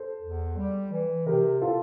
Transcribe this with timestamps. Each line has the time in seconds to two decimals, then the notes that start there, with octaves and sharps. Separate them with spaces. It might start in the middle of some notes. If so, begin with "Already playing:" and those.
Already playing: A4 C5
0.22 E2
0.57 G3
0.91 E3
1.26 C3 G4 A#4
1.62 F4 A4